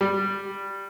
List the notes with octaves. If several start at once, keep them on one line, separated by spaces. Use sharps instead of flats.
G3